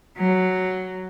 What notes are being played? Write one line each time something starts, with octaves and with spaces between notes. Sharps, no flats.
F#3